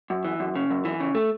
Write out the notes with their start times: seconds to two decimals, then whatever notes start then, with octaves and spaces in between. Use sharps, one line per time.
0.10 F#2
0.25 E3
0.40 F#2
0.56 C#3
0.71 F#2
0.85 E3
1.00 C#3
1.15 A3